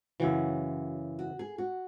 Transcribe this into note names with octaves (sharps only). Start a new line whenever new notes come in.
F#2 C#3 E3 F#4
F#4
G#4
F#4